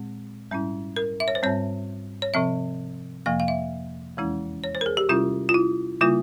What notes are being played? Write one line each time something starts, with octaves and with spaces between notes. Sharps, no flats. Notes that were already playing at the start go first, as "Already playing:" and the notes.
Already playing: A#2 G#3 C4
G#2 G3 C#4 E4
A#4
E5
C#5
C5
G#2 G3 C4 C#5
C#5
C3 F3 C4 E5
F2 C3 F3 A#3 F5
F5
E5
E2 E3 G#3 C#4 E4
C#5
C5
A#4
G#4
G4
C3 G3 C#4 E4 F4
F4
E4
C#3 G3 A#3 E4 F4